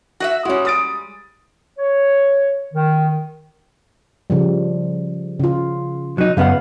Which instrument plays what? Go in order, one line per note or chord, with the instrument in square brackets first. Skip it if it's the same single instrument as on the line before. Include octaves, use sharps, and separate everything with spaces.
[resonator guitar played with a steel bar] F#4 D#5 E5
[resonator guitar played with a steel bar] G3 G#3 [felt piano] C#4 F#4
[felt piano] D#6 A6 D7
[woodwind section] C#5
D#3
[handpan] C#3 F3 G3
C#3 F4
[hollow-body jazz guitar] F#3 D#4
[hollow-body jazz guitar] F#2 B3 F#5 [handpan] C#3 F5